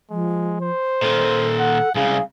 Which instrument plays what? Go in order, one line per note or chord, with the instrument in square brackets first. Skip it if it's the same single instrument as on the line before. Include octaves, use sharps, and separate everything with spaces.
[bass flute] F3 [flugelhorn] G#3
[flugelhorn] C5
[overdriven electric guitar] A#2 D#3 [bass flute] A4
[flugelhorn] F#5
[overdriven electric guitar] C2 C#3 [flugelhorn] G#4 [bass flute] F5